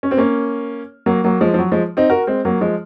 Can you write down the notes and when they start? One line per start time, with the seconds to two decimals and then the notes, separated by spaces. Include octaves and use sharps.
0.03 C#4
0.11 C4
0.17 A#3 C#4
1.06 F#3 A#3
1.24 F#3 A#3
1.41 F3 G#3
1.54 F3
1.59 F#3
1.72 F3 G#3
1.97 C4 D#4
2.10 F#4 A#4
2.27 G#3 C4
2.45 F#3 A#3
2.61 F3 G#3